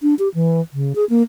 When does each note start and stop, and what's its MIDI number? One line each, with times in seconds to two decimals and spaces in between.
0.02 0.14 62
0.19 0.29 67
0.34 0.61 52
0.73 0.93 49
0.95 1.05 68
1.10 1.22 58